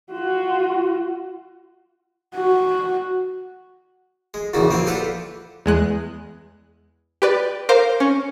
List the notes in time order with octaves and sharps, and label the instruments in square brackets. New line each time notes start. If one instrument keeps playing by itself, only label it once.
[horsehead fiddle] F4 F#4
F#4
[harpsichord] G#3
A#1 E2 C#3 E3 F#4
A#3 C4 F4
G3 F4 A4 B4 F#5
[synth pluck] E2 G#3 F#6
G4 B4 D5
A#4 C5 F5 D6
C#4